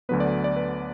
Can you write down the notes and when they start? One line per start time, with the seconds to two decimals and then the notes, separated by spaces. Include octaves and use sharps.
0.09 D2 D3 F#3 B3 B4
0.20 D5
0.44 D5
0.56 B4